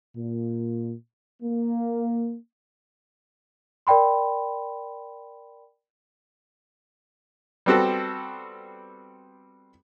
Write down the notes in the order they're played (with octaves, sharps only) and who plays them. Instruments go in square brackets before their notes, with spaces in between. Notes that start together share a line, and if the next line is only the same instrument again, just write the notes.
[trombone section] A#2
A#3
[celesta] A#4 D5 G5 B5 C6
[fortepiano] G3 B3 C4 F#4 A4